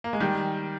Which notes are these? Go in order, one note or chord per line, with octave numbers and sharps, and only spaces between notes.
A#3
G#3
D#3 G3